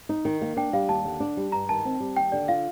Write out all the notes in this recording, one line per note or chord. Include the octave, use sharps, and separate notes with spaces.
D#4
D#3
A#3
D4 G5
G3 F5
D#2 A5
D3
D4
G3
G2 A#5
D#3 A5
C4
G3
D#2 G5
D3 D5
F4 F5